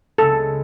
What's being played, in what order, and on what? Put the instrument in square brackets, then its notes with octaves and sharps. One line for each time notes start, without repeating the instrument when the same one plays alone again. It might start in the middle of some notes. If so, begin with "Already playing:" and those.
[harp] C#2 C#3 G#3 B3 [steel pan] A4